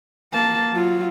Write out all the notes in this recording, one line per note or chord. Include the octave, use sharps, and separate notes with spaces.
A#3 A5
F#3 F4